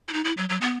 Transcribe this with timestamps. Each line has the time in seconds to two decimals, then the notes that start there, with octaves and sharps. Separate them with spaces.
0.08 E4
0.13 D#4
0.25 E4
0.37 F#3
0.49 F#3
0.61 B3